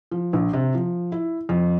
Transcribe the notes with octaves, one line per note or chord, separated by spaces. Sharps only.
F3
A#1
C3
F3
E4
F2